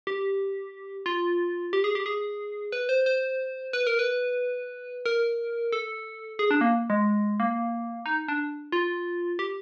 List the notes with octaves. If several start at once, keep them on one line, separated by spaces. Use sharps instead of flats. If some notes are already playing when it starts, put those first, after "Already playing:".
G4
F4
G4
G#4
G4
G#4
B4
C5
C5
B4
A#4
B4
A#4
A4
G#4
D4
A#3
G#3
A#3
D#4
D4
F4
G4